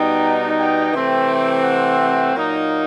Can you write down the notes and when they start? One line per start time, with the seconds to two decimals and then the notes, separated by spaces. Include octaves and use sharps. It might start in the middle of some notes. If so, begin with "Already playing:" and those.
Already playing: B2 G3 B3 D#4 G5
0.58 G5
0.93 C3 E3 A3 C4
1.29 G5
1.63 F#5
2.34 A#2 F#3 A#3 D#4